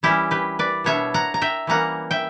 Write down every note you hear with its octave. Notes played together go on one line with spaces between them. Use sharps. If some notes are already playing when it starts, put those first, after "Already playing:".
E3 G3 C#4 E4 G4
G4 B4
B4 D5
B2 G3 B3 D4 C#5 E5
F#5 A#5
A#5
E5 G5
E3 G3 A#3 C#4 F#5 A#5
E5 G5